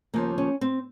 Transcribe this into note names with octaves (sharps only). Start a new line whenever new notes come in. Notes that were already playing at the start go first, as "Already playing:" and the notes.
D#2 C#3 F3 A#3
C#4
C4